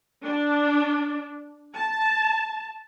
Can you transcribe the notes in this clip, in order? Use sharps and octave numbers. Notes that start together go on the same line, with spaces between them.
D4
A5